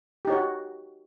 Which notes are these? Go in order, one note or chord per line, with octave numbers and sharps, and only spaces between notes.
D#4 F#4 G4 C#5